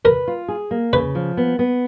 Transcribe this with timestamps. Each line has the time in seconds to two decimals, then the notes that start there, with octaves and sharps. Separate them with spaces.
0.05 A#4 B4
0.28 F4
0.48 G#4
0.71 A#3
0.93 C#3 B4
1.15 F3
1.37 B3
1.59 B3